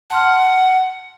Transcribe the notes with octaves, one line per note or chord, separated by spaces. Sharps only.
F#5 A5 C6 F6